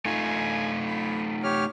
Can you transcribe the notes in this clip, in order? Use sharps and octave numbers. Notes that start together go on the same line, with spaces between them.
A3 D#4 F4 G#5
B5
G4 C#5 F6